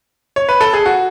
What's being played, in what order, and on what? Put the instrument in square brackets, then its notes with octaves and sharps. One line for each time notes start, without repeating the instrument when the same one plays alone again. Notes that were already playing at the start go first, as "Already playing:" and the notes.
[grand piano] C#5
B4
A4
G#4
F#4